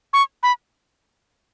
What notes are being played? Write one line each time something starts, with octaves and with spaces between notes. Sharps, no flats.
C#6
B5